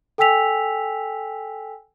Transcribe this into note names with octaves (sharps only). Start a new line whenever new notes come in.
A4 G5 G#5 E6 B6 F7